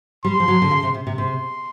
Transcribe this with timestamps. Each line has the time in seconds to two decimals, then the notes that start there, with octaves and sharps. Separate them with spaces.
0.24 G3 C6
0.40 F3
0.48 F#3
0.62 D3
0.71 C#3
0.83 C3
0.94 C3
1.07 C3
1.18 C3 C6